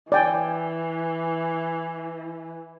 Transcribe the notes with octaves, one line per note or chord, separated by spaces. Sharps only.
E3 D5 G5 G#5